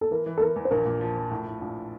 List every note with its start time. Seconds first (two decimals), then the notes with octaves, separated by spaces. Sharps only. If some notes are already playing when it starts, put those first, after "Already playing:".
0.01 A4
0.11 E3 A#4
0.26 E3
0.37 A4
0.41 E3 A#4
0.56 E2
0.65 C5
0.71 A#1 A#4
0.86 A#2
1.01 F3
1.16 F3
1.31 A2
1.46 A2
1.61 A#1